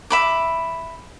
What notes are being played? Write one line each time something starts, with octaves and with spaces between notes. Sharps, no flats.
E5 B5 D6